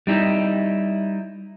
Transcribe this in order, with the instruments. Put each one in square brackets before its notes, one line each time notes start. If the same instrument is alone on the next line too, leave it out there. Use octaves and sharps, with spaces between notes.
[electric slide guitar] G3 D#4 E4